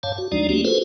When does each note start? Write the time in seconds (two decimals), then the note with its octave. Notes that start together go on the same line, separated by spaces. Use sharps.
0.03 G2 C#5 F5 A5
0.18 F#4
0.32 D#2 F3 G#3 D4 D#4 D5
0.49 A3 A#3 C#4 D4 F#4 G4
0.65 F4 F#4 G#4 A4 B4 C5